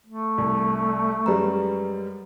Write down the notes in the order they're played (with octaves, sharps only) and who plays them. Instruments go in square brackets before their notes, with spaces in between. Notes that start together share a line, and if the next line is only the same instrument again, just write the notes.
[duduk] A3
[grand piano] C2
[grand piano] F#2 G3 G#3 [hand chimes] B4 A#5